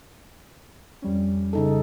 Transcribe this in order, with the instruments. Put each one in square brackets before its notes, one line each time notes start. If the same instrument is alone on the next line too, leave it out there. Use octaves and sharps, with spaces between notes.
[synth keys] F2 G3 C#4
[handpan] C#3 D#4 A4